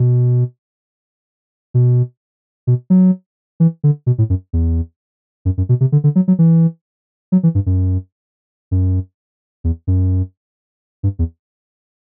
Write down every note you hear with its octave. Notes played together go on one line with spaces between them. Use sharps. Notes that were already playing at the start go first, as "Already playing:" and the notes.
Already playing: B2
B2
B2
F#3
E3
D3
B2
A2
F#2
E2
F#2
F#2
B2
C3
D3
D3
F#3
F#3
E3
F#3
E3
G2
F#2
F#2
E2
F#2
G2
E2